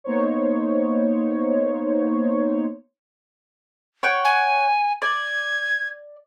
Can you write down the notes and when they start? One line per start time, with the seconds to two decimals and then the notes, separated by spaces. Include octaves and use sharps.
0.04 A#3 B3 D#4 C5 C#5
4.03 C#5 F#5 G5
4.25 G#5
5.02 D5 G#6